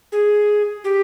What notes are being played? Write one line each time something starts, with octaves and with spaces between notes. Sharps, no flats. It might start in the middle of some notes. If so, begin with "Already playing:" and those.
G#4
G4